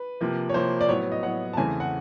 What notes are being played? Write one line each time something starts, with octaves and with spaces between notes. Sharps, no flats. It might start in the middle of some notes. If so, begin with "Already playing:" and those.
Already playing: B4
C3 F3 A#3
C#5
C3 F3 A#3 C5
D5
A2 F#3 B3 C#5
D#5
A2 F#3 B3 F#5
A5
E2 C#3 E3 A3 C4 G#5
F#5